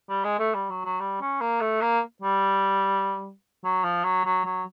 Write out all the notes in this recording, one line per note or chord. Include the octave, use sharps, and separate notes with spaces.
G3
G#3
A3
G3
F#3
F#3
G3
C#4
A#3
A3
A#3
G3
F#3
F3
F#3
F#3
F#3